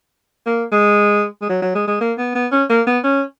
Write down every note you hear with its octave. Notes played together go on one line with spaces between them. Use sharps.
A#3
G#3
G#3
F#3
F#3
G#3
G#3
A#3
B3
B3
C#4
A#3
B3
C#4